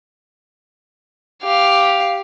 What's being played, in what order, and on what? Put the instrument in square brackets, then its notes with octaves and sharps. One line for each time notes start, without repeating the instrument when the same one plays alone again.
[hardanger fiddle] G4 F5